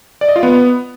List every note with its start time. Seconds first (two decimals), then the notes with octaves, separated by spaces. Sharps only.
0.21 D5
0.28 D#5
0.36 F4
0.43 B3